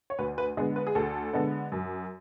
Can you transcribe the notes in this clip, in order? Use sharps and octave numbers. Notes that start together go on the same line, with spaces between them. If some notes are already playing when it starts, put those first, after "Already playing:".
C#5
D2 B4
B4
D3 G#3 B3 G#4
B4
G#4
D2 A4
D3 G#3 B3
F#2